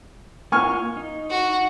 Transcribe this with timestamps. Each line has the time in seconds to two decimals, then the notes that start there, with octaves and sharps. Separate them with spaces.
0.52 A#3 F4 G#5 C#6 F6
0.97 D#4
1.30 F#4